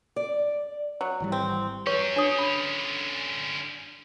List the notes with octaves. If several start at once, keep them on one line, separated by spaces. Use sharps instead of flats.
D5
F#3
G#1 E3 G3
C4
F#3 C#4 B4 C#5 C#6
D4 C#5 D#6
D3 C#4 B5